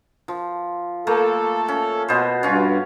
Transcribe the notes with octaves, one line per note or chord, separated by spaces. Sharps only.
F3
A3 A#3 A4
C#4
B2 B3 C5
G2 C#4 F4 F#4